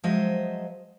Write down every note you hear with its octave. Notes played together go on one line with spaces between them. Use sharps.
F3 F#3 G#3 C5 D#5 E5